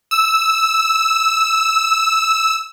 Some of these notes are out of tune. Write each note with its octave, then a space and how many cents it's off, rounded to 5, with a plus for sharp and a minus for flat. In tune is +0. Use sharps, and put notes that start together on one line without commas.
E6 -10